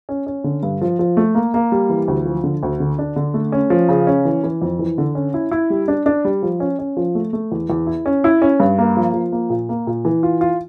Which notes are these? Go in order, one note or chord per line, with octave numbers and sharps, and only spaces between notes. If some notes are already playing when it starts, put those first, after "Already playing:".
C#4
C#4
D3
G2
F3
F3
A3
A#3
A#3
G3
E3
D2
F3
D3
D2
D3
D4
D3
A3
C#4
F3
C#3
C#4
E3
E3
F2
E3
D3
C#4
E4
E4
G3
D4
D4
G3
F3
C#4
C#4
F3
A3
A3
E2
E2
E4
C#4
E4
C#4
G2
A#3
F3
F3
A#3
A#2
A#3
A#2
E3
F4
F4